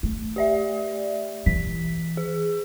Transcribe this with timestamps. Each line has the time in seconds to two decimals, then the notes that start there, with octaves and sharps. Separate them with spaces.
0.03 A3
0.36 G4 D5 E5
1.46 E3 B6
2.17 G#4